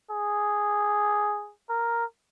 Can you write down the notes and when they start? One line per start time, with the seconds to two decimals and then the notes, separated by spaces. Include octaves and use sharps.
0.11 G#4
1.69 A#4